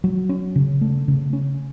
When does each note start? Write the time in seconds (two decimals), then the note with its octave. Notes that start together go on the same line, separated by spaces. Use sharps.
0.04 F#3
0.29 C#4
0.56 C#3
0.81 A3
1.08 C#3
1.33 C#4